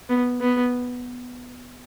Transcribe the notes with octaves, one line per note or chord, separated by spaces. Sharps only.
B3
B3